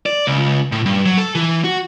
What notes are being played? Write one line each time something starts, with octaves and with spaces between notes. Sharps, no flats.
D5
C#2
A2
G2
F#3
A4
E3
F#4